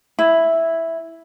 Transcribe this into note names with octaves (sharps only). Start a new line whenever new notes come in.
E4